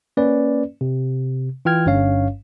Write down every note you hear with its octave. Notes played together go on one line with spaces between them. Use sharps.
A#3 C#4 B4 D5
C3
E3 F4 G5 F6 G#6
G1 G2 C#4 C#5 F5